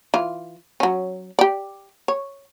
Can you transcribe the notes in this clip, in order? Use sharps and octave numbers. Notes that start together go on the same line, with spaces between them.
E3 F4
F#3 C#4
G4 D5
C#5